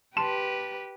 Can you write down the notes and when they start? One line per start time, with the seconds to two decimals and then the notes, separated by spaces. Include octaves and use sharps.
0.17 G4 B4 A5 C6 E7